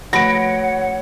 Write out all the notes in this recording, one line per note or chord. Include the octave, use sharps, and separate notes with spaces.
F3 A3 F#4 B4 C#5 F#5 A#6 D7